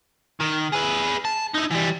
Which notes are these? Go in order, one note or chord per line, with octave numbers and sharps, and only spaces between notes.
D#3
G#4 B4
A5
D#4 E4
E3 G3